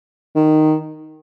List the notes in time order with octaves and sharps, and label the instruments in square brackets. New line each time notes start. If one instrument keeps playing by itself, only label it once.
[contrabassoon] D#3